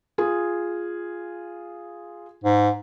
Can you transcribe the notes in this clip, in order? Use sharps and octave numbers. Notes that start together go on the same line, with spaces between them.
F4 G#4
G#2